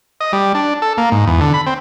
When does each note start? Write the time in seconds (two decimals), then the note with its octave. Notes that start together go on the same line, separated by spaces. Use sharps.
0.21 D#5
0.33 G3
0.55 D4
0.82 A4
0.98 A#3
1.12 G#2
1.27 E2
1.41 D3
1.54 B5
1.66 C4